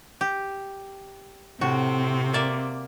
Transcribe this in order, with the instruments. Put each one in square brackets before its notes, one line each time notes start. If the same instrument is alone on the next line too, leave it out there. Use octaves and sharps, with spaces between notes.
[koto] G4
[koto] A2 F#4 [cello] C3 C4
[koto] A#3 D5 E5